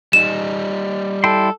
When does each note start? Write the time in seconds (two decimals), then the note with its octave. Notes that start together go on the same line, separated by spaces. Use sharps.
0.13 G3 D#4 E7
1.24 E4 A4 G5 C6